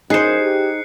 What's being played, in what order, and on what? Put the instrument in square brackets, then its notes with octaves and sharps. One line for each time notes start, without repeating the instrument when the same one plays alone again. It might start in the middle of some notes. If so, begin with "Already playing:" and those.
[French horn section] F#2 [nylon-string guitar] D#4 [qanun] G#4 C5 [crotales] F#6 C7 C#7
[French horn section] G4